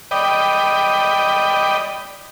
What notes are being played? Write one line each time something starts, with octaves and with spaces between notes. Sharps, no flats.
D5 D#5 G5 B5